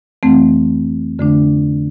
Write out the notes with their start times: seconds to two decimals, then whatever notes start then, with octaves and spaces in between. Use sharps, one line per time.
0.23 F2 E3 A3 C4
1.19 F2 D3 A3 D4